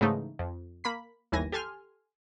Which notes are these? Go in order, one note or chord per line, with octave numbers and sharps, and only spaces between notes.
G#2 C#3 E3 A3 D#4
F2
A#3 B5 B6
G1 D#2 E3 G#5 A#6
G4 A4 G#5 C6 F6